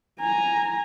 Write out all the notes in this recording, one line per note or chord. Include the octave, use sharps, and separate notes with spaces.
G#5 A#5